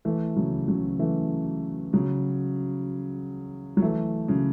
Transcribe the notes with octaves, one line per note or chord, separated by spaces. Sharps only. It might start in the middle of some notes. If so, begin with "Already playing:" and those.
E3 A3
C#3 F#3
C#3 F#3
E3 A3
C#3 F#3
F#3
E3 A3
C#3 F#3